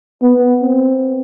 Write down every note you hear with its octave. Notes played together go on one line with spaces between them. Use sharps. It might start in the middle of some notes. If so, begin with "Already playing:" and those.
B3
C4